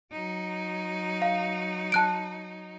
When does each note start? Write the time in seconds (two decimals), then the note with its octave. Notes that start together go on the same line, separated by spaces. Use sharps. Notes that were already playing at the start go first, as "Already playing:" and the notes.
0.11 F#3 D#4
1.22 F5
1.92 A5 F#6 D7